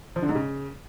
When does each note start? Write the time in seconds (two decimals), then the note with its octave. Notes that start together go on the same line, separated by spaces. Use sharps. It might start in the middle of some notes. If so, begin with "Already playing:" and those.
0.16 F3
0.22 D3
0.29 G#2
0.35 C#3